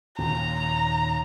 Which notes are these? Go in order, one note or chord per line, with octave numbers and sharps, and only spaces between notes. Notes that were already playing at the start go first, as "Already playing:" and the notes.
D#2 A#2 C#3 A#5